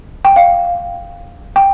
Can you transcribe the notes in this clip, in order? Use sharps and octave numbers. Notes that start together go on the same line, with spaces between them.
G5
F5
G5